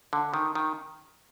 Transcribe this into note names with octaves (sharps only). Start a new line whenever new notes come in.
D3
D#3
D#3